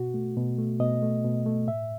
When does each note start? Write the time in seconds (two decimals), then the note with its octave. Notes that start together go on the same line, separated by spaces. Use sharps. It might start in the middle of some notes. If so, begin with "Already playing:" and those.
Already playing: B2 F#4
0.14 A3
0.37 B2
0.58 A3
0.80 B2 D#5
1.02 A3
1.25 B2
1.46 A3
1.68 A2 E5